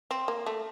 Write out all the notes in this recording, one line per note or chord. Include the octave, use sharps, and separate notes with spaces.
C4
A#3
A3